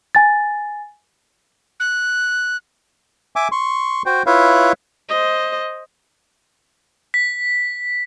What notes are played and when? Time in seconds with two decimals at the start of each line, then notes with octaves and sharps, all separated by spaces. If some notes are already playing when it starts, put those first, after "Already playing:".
0.15 G#5 A6
1.80 F#6
3.36 E5 G#5 D6
3.52 C6 C#6
4.06 F#4 C5 G5
4.26 E4 F4 B4 C#5 E5 F5
5.09 C5 D#5
7.14 B6